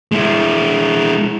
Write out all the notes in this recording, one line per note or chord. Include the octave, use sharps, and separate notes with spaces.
G#3 E4